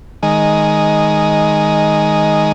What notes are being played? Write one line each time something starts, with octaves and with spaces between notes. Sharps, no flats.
D#3 G#3